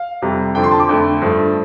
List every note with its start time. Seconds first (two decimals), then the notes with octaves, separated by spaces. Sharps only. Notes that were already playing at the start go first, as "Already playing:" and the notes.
Already playing: F5
0.22 F2 C3 G3
0.55 F2 D3 F3 G5
0.64 C6
0.71 A5
0.80 D6
0.89 F2 D3 A3
1.21 G2 F3 A3